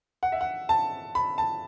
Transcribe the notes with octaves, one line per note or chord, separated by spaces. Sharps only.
F#5
E5
F#5
A5
B5
A5